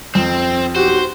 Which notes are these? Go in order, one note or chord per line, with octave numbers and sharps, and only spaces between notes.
F2 C4
B1 F#4 G4 C5